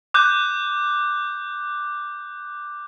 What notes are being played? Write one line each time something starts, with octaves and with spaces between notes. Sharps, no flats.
D6 F#6 G6